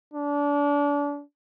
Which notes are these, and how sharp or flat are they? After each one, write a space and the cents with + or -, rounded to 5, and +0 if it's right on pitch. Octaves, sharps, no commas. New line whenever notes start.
D4 -30